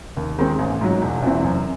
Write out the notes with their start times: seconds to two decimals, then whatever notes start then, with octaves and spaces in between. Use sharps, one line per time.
0.17 D#2
0.39 D#3 G#3 C4
0.59 A1
0.81 G#2 F#3
1.02 E1
1.23 E2 C3 E3 C4
1.44 F#2